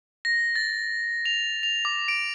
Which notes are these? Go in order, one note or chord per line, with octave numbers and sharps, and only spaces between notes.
A#6
A6
F7
F7
D6
D7